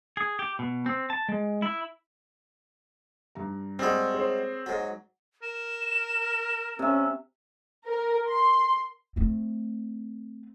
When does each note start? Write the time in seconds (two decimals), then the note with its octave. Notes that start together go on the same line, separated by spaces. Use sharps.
0.17 G#4
0.39 G4
0.59 B2
0.86 C4
1.10 A5
1.29 G#3
1.62 E4
3.35 G2 A#5
3.79 G3 G#3 C4 F#4
4.14 G#4 C5 C#5
4.66 G#2 F#3
5.43 A#4 E7
6.79 C3 C#4 E5
7.86 A#4
8.28 C6
9.16 A3 C4